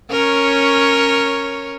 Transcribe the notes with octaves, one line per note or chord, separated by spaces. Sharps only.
C#4 A#4 C#5